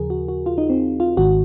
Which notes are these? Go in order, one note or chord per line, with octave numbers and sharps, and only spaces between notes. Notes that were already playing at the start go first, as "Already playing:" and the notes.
Already playing: D#2 C#3 F3 G#4 A#4
F#4
F#4
F4
D#4
C4
F4
G#1 G#2 D#3 F#4